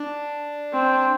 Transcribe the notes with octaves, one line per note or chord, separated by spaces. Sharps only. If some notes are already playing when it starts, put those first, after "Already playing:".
Already playing: D4
C4